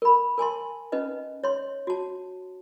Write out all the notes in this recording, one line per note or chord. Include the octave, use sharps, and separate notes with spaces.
A#4 B5
A#4 G#5 A5 C6
C#4 D#4 B4 D#5
C#5 C6
F#4 A5